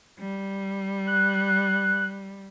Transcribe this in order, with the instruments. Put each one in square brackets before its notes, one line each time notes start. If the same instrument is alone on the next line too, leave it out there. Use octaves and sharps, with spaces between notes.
[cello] G3
[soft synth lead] F#6